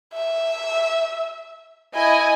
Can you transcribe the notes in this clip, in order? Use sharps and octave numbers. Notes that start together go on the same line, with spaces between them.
E5
E4 D#5 G#5